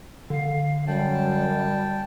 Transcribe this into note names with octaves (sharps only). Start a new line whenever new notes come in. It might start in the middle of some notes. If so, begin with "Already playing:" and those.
D3 F5
F#2 G3 G5 A5